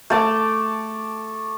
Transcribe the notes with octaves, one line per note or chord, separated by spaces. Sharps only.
A3 A5 D6